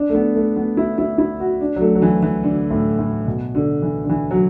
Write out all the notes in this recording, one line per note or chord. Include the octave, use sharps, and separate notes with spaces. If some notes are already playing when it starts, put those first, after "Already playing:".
Already playing: D4
A3
B3
A3
B3
E4
E4
E4
F#4
D4
F#3
A3
F#3
E3
E3
D3
A2
A2
B2
D3
E3
D3
E3
F#3